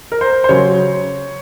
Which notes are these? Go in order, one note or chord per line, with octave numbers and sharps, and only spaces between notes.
A#4
C5
C5
C#3 F#3 C#5